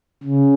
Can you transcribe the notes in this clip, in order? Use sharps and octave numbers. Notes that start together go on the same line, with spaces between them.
C#3